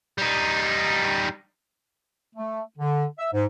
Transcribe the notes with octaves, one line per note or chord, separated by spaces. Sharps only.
G3 D#4
A3
D3
E5
G#2